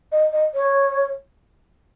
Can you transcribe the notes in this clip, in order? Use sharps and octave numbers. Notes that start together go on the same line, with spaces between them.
D#5
D#5
C#5